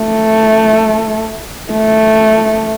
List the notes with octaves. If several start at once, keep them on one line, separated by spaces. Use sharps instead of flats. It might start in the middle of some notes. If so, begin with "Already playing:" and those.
Already playing: A3
A3